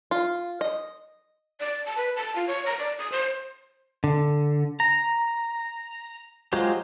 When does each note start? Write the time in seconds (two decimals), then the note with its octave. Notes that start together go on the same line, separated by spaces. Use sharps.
0.11 F4
0.61 D#5
1.60 D5
1.86 A5
1.98 B4
2.16 A5
2.36 F4
2.47 C#5
2.66 A#5
2.79 D5
2.99 D#6
3.12 C5
4.04 D3
4.80 A#5
6.53 F#3 G#3 F4 G4 C5